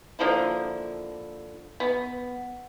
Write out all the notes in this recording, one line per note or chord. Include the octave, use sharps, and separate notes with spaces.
D3 F3 A#3 E4
B3